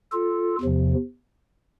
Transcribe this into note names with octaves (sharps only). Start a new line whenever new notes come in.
F4 A4
E2 C3 F3